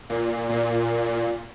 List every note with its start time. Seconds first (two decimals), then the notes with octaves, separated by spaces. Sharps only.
0.10 A#2
0.49 A#2